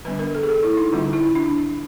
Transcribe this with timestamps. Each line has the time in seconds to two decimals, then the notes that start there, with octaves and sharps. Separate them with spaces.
0.05 D3 G3 B3 D4 B4
0.19 A#4
0.35 A4
0.43 G#4
0.49 A4
0.63 E4
0.77 D#4
0.92 D3 G3 A#3 C#4 F4
1.13 E4
1.35 D4